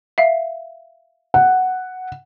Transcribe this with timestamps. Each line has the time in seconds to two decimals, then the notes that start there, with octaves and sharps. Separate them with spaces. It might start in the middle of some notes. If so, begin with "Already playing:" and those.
0.18 E5 F5
1.34 F#5